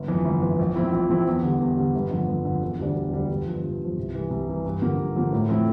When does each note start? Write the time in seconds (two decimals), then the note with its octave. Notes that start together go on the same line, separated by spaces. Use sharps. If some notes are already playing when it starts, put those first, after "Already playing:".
Already playing: G1
0.08 F2 E3
0.25 G1
0.42 F2 E3
0.59 A#1
0.75 A#2 F3 C4 E4
0.92 A#1
1.09 A#2 F3 C4 E4
1.27 E2
1.43 D3 G3
1.60 E2
1.77 D3 G3
1.95 G1
2.11 F2 D3
2.28 G1
2.45 F2 D3
2.63 E1
2.79 D2 D3 G3 D4
2.96 E1
3.12 D2 D3 G3 D4
3.29 G1
3.46 G2 F3
3.64 G1
3.80 G2 F3
3.97 C2
4.14 C3 E3 G3
4.31 C2
4.47 C3 E3 G3
4.65 G2
4.82 D3 F3 A#3
4.98 G2
5.16 D3 F3 A#3
5.33 A2
5.49 F3 A3 C4 E4